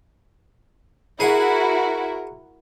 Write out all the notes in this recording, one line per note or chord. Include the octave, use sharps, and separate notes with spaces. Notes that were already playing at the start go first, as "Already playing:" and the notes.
E4 F#4 G#4 A#4 F#5